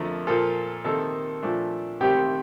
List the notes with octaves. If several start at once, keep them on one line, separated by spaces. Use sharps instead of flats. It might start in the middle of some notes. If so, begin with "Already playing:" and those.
Already playing: F2 D3 F3 A3 A#4
A#2 F3 A#3 F4 A4
C3 D#3 A#3 D#4 A4
A#2 F3 A3 D4
C2 C3 D#3 A3 C4 G4